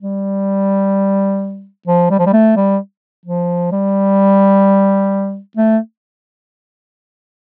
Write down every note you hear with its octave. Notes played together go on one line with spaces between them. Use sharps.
G3
F3
G3
F3
G3
A3
G3
F3
G3
A3